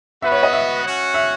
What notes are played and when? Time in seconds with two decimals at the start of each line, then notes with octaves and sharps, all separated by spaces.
0.22 B3 F#4 B4 E5
0.32 C#5
0.43 D#5
0.53 E5
0.83 C#4 F#4 C#5 F#5
1.14 E5